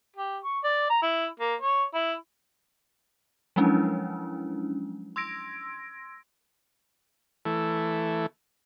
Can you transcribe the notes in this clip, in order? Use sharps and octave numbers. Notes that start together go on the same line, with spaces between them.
G4
C#6
D5
A#5
E4
A#3
C#5
E4
F3 F#3 G#3 C#4 D4 E4
C6 E6 G#6 A#6 D7
E3 A3